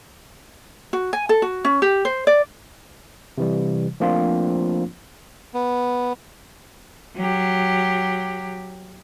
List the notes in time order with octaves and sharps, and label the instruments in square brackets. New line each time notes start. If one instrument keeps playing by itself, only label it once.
[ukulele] F#4
G#5
A4
F#4
C#4
G4
C5
D5
[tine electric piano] C3 E3 G3
F3 A3 A#3 C4 D4 F4
[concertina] B3
[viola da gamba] F#3 G4